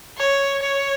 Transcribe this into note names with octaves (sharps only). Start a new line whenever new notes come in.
C#5
C#5